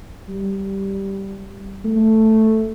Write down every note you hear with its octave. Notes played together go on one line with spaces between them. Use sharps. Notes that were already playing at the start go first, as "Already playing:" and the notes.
G3
A3